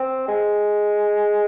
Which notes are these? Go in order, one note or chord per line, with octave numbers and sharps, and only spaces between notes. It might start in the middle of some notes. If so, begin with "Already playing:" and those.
Already playing: C4
G#3